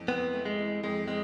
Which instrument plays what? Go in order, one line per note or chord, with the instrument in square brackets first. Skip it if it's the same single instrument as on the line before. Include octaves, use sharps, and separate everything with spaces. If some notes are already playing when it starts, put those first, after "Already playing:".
Already playing: [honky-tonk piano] F2 E3 A3
[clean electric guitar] B3 [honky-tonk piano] C4
[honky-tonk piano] A3
[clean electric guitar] G#3
[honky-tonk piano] E3
[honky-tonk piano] F2 [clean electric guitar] G#3
[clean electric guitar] G#3 [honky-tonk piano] C4